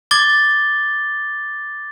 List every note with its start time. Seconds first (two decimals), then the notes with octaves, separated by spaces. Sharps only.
0.11 D6 G#6 A6 G7